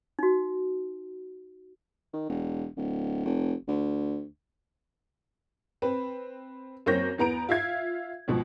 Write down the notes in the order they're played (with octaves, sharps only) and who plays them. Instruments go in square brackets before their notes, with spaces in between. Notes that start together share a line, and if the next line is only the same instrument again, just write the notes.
[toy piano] D#4 F#4
[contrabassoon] D#3
E1
D1
F1
D2
[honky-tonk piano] C4 B4
F#2 A#3 C4 C#5 G6 A#6
E2 B3 A#5 D7
F4 E5 F5 G#6
C#2 B2 F3